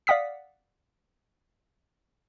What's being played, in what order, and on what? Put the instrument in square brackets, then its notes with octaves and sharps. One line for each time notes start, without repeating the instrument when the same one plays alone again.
[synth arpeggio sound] D5 F5 F#5 D#6 B6